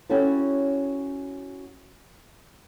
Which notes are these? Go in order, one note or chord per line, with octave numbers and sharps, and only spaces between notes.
C#4 E4 F#4 G4 A4 C#5